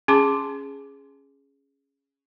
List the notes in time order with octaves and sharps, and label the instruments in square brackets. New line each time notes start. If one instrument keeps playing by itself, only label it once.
[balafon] C#4 G#4 A5 C6 D6